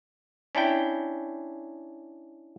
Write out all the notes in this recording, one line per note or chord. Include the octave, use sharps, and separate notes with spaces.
C#4 D4 E4 G5